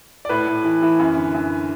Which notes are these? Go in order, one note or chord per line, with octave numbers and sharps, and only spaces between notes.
D5
A2 B4
A2
E3
E3
F#2
D3
F#2